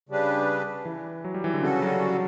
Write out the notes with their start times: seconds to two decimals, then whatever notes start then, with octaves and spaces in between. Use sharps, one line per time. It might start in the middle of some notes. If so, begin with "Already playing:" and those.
0.09 C#3 G3 D4 G4 B4
0.85 E3
1.24 F#3
1.34 G3
1.44 E3
1.54 D3
1.62 C#3 G3 C#4 F#4 A4
1.82 F#3